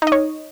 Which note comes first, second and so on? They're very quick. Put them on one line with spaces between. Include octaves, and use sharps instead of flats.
D#4 D#5 C#5